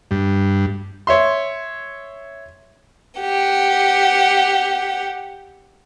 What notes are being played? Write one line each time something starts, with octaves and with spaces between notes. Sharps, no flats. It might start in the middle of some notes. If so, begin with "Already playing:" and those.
G2
C#5 E5 C6
G4 F#5